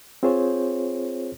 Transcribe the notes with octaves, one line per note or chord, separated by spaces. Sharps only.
C4 F4 G#4 C5 C#5